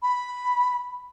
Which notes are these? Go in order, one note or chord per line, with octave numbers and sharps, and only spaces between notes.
B5